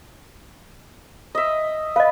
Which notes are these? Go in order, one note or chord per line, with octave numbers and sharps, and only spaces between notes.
D#5 E5
B4 D#5 F5